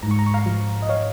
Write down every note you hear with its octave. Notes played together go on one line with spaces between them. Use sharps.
G#2 A#5
C#6
A#5
C#6
F5 A#5
F3
D#5
C#5 F5